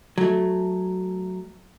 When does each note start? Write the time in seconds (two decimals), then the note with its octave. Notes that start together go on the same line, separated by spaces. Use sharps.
0.18 F#3 A3